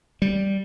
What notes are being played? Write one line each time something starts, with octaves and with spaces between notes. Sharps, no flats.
G3